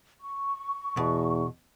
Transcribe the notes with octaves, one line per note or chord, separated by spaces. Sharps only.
C#6
E2 B2